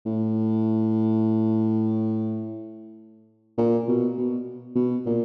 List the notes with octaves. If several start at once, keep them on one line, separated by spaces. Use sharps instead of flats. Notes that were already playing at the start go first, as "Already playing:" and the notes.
A2
A#2
B2
B2
B2
A#2